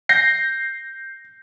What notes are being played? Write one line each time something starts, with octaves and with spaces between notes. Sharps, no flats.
G6 A#6 C7